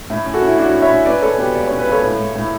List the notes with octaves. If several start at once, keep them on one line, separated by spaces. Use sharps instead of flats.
A2 E4
C#4
F#4 A4
C#4
E4
C#4 D4 F#4
C#4
C#5 E5
C#4
C#4 B4 D5
C#4 A4 C#5
B2 G4 B4
C#2 D5
C#4 C#5
B4
C#2 A4 C#5
A2
A2
A2